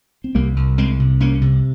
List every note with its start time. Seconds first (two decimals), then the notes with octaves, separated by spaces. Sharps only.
0.24 C4
0.35 C2 G3 A#3
0.56 C2
0.78 C2 G#3 C4
1.00 C3
1.20 C2 A#3 C#4
1.41 C3